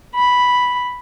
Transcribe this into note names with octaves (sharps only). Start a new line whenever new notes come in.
B5